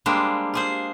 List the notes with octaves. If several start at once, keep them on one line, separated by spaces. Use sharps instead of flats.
G3 G#3 A#3 D4 C5
F4 G#4 C5